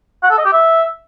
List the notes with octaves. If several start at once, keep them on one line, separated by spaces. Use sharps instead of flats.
F#5
A4
D#5
G4
E5